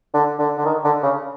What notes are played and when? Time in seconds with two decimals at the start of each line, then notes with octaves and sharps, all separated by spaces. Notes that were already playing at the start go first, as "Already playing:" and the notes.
0.14 D3
0.39 D3
0.58 D3
0.65 D#3
0.84 D3
1.03 C#3